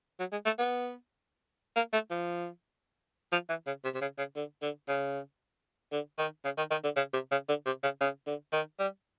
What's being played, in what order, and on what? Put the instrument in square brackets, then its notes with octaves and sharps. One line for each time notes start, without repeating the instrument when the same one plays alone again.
[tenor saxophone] F#3
G#3
A3
B3
A#3
A3
F3
F3
E3
C#3
C3
C3
C#3
C#3
D3
D3
C#3
D3
D#3
C#3
D#3
D#3
D3
C#3
C3
C#3
D3
C3
C#3
C#3
D3
D#3
G3